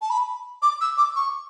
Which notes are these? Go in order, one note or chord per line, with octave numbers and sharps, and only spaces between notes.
A5
B5
D6
E6
D6
C#6